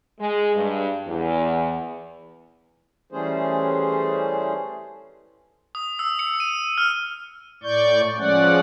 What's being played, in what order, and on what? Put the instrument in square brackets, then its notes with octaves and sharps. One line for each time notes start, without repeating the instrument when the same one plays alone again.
[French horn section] G#3
G2
E2
[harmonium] E3 G3 A3 C#4 G#4 C5
[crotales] D#6
E6
C#7
D#7
F6
[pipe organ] A2 D5 C#6 G6
F3 G#3 C#4 D5 F#5